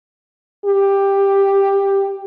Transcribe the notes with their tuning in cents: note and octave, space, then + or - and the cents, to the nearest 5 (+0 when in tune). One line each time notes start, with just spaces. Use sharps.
G4 +10